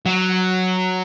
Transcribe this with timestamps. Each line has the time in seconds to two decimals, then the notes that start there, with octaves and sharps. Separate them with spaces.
0.06 F#3